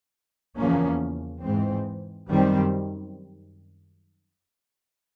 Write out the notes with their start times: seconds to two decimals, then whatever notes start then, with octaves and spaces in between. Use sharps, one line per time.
0.56 E2 C#3 F3 A#3 C#4
1.42 G#2 E3 G#3 C4
2.28 F#2 D#3 G3 C4